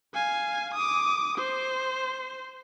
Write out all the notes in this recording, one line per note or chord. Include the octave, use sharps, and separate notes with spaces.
F5 G#5
D6 D#6
C5